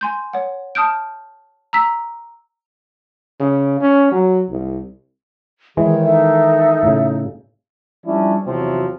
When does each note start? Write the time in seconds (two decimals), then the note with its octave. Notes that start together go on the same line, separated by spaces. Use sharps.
0.01 G#5 C6 G6
0.33 C#5 F#5
0.75 A5 D#6 F6 G6 D7
1.73 A#5 E6 B6
3.40 C#3
3.80 C#4
4.11 F#3
4.51 C2
5.77 D#3 E3 G#3 G#4 C#5
6.03 D#4 A4 E5
6.83 A2 C#3
8.05 F3 G3 C#4 D4 E4
8.45 E2 C3 F3 F#3 C4 F#4